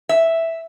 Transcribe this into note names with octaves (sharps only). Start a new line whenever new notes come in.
E5